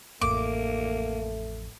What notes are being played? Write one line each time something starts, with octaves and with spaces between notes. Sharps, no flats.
A1 F2 A3 A#3 D6